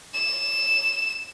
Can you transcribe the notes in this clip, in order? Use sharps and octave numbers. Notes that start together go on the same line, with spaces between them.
E7